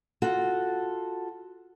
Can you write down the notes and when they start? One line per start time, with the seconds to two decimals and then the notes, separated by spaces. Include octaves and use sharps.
0.22 F4 F#4 A4